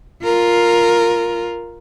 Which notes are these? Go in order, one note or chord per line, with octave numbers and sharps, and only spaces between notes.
F4 A#4